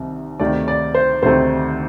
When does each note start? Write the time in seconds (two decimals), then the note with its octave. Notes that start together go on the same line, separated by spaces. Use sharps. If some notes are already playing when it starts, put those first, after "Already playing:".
Already playing: C2 C3 D#3
0.40 D2 C3 D#3 A3 D5
0.68 D5
0.94 C5
1.23 D2 C3 D#3 A3 C5